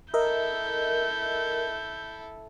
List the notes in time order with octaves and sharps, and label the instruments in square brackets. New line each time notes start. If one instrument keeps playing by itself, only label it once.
[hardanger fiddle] E4 A4 [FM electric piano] A#4 D#5 E5 [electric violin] G6